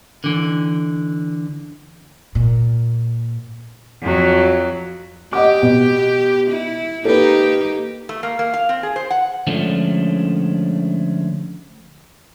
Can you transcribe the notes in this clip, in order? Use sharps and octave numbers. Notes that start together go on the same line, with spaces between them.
D3 E3
A#2
F2 F#3
G4 D#5 F#5 D6
B2
E4
A#3 D#4 G4 A4 B4
A3
A#3
A#3
F5
C4
G#4
C5
F#5
D3 F3 G#3 A3 C#4 D4